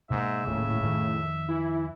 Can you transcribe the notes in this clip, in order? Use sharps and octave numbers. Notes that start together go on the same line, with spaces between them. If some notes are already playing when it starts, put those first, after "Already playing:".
G#2 B2 A#3 E5
D#1 A2 C#3 A#3 C#4
F2 A2 D#3
E3 E4